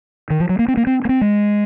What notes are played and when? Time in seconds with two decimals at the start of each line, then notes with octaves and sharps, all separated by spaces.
0.30 D#3
0.40 F3
0.49 F#3
0.59 A#3
0.68 C4
0.77 A#3
0.87 C4
1.05 A#3
1.09 C4
1.21 G#3